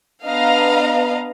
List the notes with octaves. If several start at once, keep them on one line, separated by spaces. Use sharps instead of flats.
B3 D4 D#5 F5 A#5